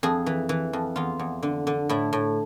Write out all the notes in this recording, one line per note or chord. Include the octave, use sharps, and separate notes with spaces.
F2 G#4
E3
E3
F2
E2 F4
E2
D3
D3
A2 E4
A2